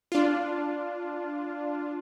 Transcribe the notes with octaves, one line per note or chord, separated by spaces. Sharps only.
D4 F4